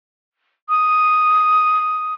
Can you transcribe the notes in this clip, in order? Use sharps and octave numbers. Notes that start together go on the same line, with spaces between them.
D#6